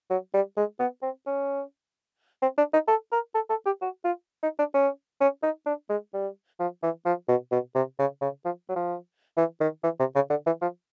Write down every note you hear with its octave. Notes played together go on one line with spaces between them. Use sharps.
F#3
G3
G#3
B3
C4
C#4
C4
D4
D#4
A4
A#4
A4
A4
G4
F#4
F4
D#4
D4
C#4
C#4
D#4
D4
G#3
G3
F3
E3
F3
B2
B2
C3
C#3
C#3
F3
F#3
F3
E3
D#3
E3
C3
C#3
D3
E3
F3